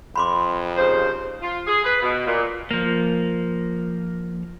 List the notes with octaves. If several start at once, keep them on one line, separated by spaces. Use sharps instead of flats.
F2 B5 C6 D6
D#2 C#3 C5
F4
G#4
B4
B2
A#2
F3 A#3